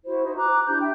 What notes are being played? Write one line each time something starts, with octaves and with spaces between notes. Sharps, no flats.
E4 F#4 C5
D#4 F#4 C5
A#5 D6 F#6
D4 E4 G4 G6
E5 G5